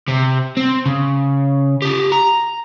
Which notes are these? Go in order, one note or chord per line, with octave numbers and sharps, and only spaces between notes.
C3
C4
C#3
G4 A4
A#5